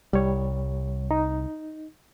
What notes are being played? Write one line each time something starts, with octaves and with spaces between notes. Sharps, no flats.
C2 G3 C#5
D#4